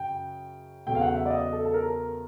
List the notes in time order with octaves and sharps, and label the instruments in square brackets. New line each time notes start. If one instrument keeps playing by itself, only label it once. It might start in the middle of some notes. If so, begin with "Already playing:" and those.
Already playing: [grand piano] F#2 C#3 G5
E2 C#3 F#3 A3 G5
F5
F#5
E5
D5
D#5
A4
A4
A#4